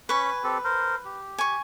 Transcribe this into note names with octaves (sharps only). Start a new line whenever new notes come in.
C#4 B4 C#5 B5 C#6
G#5
C4 G4 A4
A#4 C5
G4
G#5 C#6